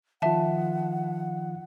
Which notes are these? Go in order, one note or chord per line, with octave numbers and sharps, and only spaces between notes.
D#3 F3 F4 E5 F#5 A5